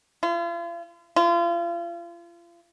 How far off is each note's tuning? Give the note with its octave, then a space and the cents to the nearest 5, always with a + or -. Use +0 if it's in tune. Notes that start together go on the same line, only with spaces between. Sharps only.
F4 -40
F4 -35